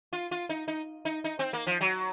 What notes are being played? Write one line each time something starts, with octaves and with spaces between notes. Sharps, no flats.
F4
F4
D#4
D#4
D#4
D#4
C4
A#3
F3
F#3